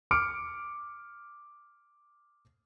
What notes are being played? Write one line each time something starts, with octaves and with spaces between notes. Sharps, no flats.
D6 F6 C#7 D7